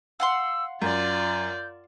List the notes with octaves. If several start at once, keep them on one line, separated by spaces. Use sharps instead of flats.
F5 F#5 C6 E6
F#2 F4 D5 G6